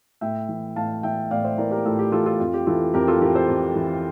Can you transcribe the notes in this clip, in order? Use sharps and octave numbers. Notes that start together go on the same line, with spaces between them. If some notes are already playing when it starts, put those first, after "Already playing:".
A2 E5 G5
E3
A2 F5 A5
E3 E5 G5
A2 D5 F5
C5 E5
E3 A#4 D5
G4 A#4
A2 F4 A4
G4
E3 F4 A4
F4 A4
F2 F4
G4
E3 F4 A4
F2 G4 A#4
F4 A4
E3 G4 A#4
A4 C5
F2
E3